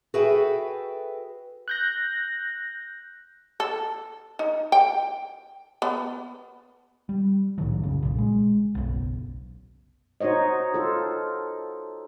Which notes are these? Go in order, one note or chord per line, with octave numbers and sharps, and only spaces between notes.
F#4 G#4 A4 B4 E5 G5
F#6 G6 A#6
A4
D#4
G5
B3
G3
C2 A2 D#3 F#3
F#2 C#3
B1 A#2
G#3
F#1 B1
D#4 F#4 C5 C#5 D#5
F4 A4